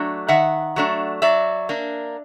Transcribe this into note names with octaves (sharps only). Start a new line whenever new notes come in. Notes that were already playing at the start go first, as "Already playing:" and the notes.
Already playing: F#3 A3 D4
D#3 E5 F#5
F#3 A3 D4
F#3 D5 E5
A#3 D4